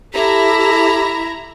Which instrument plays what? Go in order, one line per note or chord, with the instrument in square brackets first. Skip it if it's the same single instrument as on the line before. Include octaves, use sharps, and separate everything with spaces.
[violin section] E4 A#5 [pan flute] G4 [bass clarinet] A4